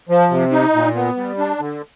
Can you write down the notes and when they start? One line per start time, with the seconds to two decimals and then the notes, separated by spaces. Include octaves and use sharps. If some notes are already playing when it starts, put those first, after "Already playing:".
0.09 F3
0.30 C3
0.52 D#4
0.74 A#2
0.95 B3
1.16 G3
1.38 D4
1.60 D3